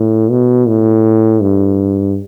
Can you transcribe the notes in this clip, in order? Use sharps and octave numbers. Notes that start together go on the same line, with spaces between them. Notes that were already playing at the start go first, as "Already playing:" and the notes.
Already playing: A2
B2
A2
G2